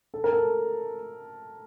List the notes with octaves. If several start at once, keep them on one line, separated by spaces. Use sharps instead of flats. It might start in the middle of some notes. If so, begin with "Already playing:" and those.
A4
A#4
A4